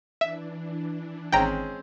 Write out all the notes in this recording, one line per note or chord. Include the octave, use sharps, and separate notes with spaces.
E3 D4 E5
G#1 G#3 C4 C#4 G5 A#5